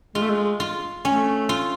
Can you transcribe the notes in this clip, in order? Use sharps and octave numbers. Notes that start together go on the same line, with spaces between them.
G#3 F4
A3
G#3
F4
A3 C#4
F4